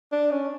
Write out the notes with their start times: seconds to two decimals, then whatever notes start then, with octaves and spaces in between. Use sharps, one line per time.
0.12 D4
0.31 C#4